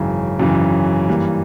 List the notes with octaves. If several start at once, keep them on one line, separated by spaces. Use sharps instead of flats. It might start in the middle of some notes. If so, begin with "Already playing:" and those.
Already playing: G#1 F#2 C#3 E3
G#1 F#2 C#3 E3
G2 E3 G3 A#3